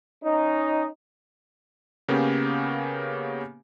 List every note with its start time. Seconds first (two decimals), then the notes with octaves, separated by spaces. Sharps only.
0.23 C#4 D#4
2.08 C#3 A#3 B3 C#4 G4